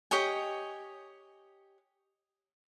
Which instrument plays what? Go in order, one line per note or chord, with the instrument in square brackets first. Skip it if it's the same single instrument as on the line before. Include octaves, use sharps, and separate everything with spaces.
[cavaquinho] G4 C#5 D#5 G#5